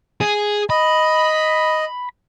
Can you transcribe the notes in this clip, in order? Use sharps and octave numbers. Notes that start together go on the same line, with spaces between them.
G#4
D#5 B5